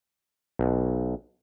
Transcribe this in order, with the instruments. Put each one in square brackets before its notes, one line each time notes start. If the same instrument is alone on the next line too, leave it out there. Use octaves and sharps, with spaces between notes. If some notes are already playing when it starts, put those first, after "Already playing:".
[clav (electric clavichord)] B1